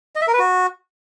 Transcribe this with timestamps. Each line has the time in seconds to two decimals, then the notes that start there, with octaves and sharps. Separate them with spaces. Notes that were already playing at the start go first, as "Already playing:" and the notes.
0.16 D#5
0.21 E5
0.27 A#4
0.33 B4
0.39 F#4